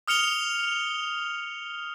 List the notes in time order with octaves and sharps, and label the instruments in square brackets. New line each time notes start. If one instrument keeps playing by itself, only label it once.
[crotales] D#6 F6 C#7 F7 G7